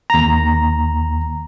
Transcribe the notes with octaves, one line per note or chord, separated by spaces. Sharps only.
D#2 A#5